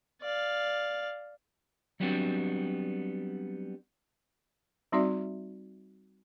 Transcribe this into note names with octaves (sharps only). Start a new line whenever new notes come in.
D5 F5
F#3 G3 B3 C4 D4 F#4
G3 C4 D#4 F#4 D5 E5